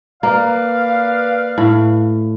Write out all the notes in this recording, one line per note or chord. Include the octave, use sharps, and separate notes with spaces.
A#3 B4 D5 F5
A2